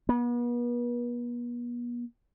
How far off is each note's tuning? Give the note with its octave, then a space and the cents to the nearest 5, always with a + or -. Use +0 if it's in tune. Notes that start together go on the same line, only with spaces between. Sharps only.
B3 -40